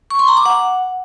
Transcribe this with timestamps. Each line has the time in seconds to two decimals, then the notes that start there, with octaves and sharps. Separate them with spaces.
0.11 C#6
0.19 C6
0.28 A#5
0.37 D6
0.46 F#5